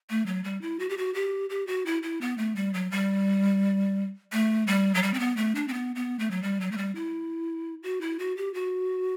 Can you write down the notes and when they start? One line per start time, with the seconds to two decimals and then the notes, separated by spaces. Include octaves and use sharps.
0.10 A3
0.26 F#3
0.44 G3
0.62 E4
0.80 F#4
0.89 G4
0.97 F#4
1.14 G4
1.50 G4
1.67 F#4
1.86 E4
2.03 E4
2.21 B3
2.38 A3
2.56 G3
2.74 F#3
2.91 G3
4.32 A3
4.67 G3
4.95 F#3
5.03 G3
5.14 C4
5.19 B3
5.37 A3
5.55 D4
5.68 C4
5.73 B3
5.96 B3
6.19 A3
6.31 F#3
6.43 G3
6.61 F#3
6.72 A3
6.78 G3
6.95 E4
7.83 F#4
8.01 E4
8.19 F#4
8.37 G4
8.54 F#4